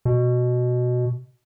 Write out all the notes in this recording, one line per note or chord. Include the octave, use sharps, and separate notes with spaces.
B2